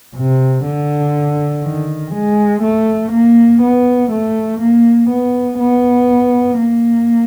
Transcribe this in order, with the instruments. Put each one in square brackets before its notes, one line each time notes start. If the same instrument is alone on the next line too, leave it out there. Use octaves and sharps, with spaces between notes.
[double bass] C3
D3
D#3
G#3
A3
A#3
B3
A3
A#3
B3
B3
A#3